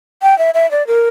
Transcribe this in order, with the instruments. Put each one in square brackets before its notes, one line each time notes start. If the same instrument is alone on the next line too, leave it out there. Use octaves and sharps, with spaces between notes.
[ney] G5
E5
E5
D5
A#4